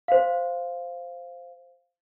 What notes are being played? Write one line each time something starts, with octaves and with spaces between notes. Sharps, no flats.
C5 F5